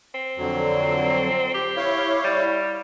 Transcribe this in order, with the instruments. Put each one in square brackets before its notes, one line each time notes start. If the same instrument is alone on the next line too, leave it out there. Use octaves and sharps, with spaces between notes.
[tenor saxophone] C4
[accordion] F2 D3 F#3
[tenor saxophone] G4
[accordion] E4 C#5 F5
[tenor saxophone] G3